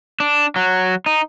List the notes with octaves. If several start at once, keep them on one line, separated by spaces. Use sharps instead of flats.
D4
F#3
D#4